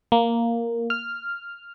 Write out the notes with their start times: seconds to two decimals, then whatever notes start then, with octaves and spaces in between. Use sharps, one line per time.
0.12 A#3
0.90 F6